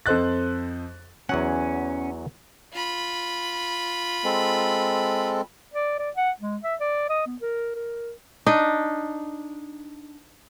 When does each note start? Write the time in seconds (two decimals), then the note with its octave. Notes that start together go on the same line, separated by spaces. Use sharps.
0.06 F2 A4 C5 D#5 F#6 A6
1.29 E2 F#3 C#4 F#5
2.73 F4 B5
4.24 G#3 C4 A4
5.73 D5
5.99 D5
6.17 F#5
6.40 G#3
6.63 E5
6.80 D5
7.10 D#5
7.27 B3
7.41 A#4
7.75 A#4
8.46 D4 D#4 D#5